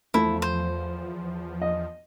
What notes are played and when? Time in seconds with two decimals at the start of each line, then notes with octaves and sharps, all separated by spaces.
0.14 E2 F3 A3 E4
0.42 C5
1.62 D#5